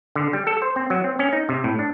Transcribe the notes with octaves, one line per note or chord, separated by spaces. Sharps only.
D3
G3
A4
C5
C4
F#3
C4
C#4
D#4
C3
A2
D4